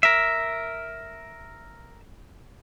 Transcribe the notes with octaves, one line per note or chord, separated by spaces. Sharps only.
A#4 E5